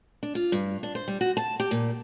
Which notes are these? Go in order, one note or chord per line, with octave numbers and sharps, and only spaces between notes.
D4
F4
G2
D4
C5
G3
F#4
A5
G4
A#2